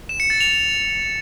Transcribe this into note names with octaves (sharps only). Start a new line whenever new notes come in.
E7
C#7
A6
F7